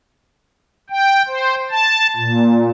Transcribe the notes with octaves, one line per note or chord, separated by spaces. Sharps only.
G5
C5
A5
A#2